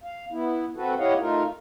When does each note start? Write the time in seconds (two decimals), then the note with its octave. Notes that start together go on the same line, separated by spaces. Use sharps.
0.04 F5
0.32 B3 E4
0.77 C4 F#4 A4 B4
0.99 E4 G4 C#5 D#5 F5 F#5
1.20 A3 D#4 F4 A#4